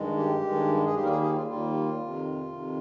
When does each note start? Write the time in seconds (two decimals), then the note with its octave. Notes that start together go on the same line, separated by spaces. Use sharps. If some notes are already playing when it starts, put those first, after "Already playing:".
Already playing: G2 D#3 G#3
0.16 G4
0.42 G2 D#3 G#3
0.84 G#4
0.94 D#2 D#3 G3 A#3 G4
1.04 A#4
1.08 G#4
1.21 G#4
1.34 F4
1.47 D#2 D#3 G3 A#3 F4
2.00 F2 C3 D#3
2.52 F2 C3 D#3